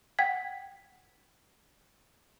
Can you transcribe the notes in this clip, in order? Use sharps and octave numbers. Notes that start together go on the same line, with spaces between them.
F#5 G5 G#6 B6